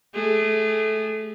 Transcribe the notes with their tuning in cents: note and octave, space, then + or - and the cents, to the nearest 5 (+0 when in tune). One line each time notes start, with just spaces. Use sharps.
A3 -20 G#4 -25